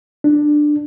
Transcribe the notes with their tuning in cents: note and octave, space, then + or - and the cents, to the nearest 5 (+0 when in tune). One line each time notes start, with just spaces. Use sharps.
D4 +15